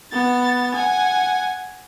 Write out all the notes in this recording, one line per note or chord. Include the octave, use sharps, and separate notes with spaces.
B3 A6
F#5 G#5